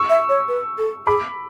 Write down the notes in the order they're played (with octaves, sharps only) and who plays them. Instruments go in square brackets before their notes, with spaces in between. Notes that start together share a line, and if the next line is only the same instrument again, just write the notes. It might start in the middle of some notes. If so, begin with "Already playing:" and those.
Already playing: [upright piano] C#6 E6
[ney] E5
C#5
B4
A4
[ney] G#4 [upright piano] B5 D6